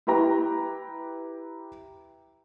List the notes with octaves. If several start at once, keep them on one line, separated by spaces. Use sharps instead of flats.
E4 G4 B4 G5 A#5